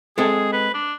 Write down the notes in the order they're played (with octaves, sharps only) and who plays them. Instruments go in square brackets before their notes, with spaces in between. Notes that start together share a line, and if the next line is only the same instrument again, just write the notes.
[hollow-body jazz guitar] G#3 C4 A4 [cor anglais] G#4
[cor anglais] B4
D4